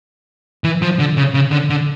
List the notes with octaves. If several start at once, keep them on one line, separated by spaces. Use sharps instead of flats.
E3
F3
D3
C#3
C#3
D3
D3